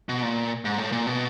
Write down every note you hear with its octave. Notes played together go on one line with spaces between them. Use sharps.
B2
A#2
G#2
A2
A#2
B2